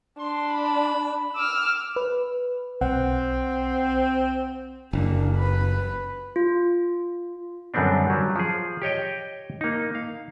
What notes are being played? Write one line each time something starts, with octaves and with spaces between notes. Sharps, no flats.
D4 C6
B5
D6 E6 F6
B4
B1 C4 F#5
F#1 A#3 D4
B4
F4
F#2 D3 G3 B3 C4 D4
F#3 G3
F3 G#4
G4 C#5 D#5 G5
A#3 D#4
F5